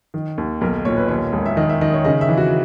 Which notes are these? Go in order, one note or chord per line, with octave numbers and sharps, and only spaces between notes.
D#3
D#2
B1 A#4
A#2 C#5
B4
D#2 C#5
E1
E5
D#3 D#5
E5
D#3 D#5
C#5
C#3 D#5
E5
E3
F#4